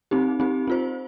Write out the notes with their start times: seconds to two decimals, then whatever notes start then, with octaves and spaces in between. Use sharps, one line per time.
0.11 C4 D#4 G4
0.40 C4 D#4 G4
0.68 C4 F4 C5